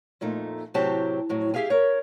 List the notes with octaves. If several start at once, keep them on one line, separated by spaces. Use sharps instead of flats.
F2 A#2 A3 D#4
A2 C3 F#3 C4 G4 A5
F2 A2 F#3
G4 G#4 E5 F5 G#5
A#4 C#5